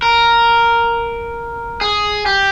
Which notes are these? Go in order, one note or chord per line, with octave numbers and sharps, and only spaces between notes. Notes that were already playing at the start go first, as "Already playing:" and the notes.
A#4
G#4
G4